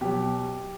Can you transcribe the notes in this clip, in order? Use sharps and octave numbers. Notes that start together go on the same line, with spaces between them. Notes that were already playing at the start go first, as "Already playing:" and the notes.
B2 F#3 G4